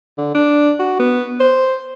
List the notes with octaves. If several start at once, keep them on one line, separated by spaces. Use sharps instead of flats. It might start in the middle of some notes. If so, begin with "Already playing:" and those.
D3
D4
F#4
B3
C5